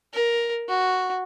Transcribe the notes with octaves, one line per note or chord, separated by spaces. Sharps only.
A#4
F#4